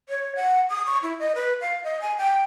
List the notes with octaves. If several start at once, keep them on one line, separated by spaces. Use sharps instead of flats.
C#5
F#5
D#6
C#6
E4
D#5
B4
F5
D#5
G#5
G5